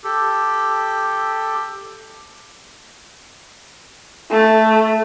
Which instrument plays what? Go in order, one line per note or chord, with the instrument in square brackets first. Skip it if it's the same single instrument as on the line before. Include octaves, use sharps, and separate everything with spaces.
[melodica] G4 A4
[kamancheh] A3